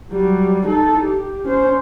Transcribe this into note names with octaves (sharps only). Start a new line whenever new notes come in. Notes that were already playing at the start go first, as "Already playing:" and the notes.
F#3 G3
D#4 A4
G4
C#4 C5